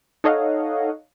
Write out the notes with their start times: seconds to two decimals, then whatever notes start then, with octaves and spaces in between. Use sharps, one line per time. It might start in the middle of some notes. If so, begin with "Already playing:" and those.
0.24 D#4 A4 C#5 D#5 F5 F#5